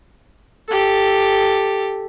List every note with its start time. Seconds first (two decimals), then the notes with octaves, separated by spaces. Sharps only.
0.68 G4 A4